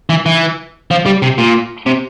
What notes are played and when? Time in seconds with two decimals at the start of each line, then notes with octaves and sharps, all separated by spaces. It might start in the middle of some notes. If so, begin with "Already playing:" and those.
0.10 E3
0.26 E3
0.91 F3
1.06 G3
1.22 C3
1.38 A#2
1.86 C3